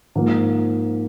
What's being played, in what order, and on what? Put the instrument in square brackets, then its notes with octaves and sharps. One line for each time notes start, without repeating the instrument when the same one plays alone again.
[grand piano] G#2 F3 A#3